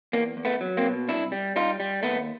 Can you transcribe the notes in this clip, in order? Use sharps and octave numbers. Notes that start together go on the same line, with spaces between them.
E2 A#3
E2
A3 B3
F#3
A#3 C4
B2
C2 D4 E4
G3
G3 D#4 F4
G3
D#2 A3 B3